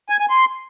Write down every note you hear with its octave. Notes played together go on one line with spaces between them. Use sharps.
G#5
G#5
C6